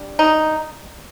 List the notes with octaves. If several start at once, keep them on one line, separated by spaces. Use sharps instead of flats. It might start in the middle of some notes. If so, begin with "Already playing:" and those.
Already playing: G3 D4
D#4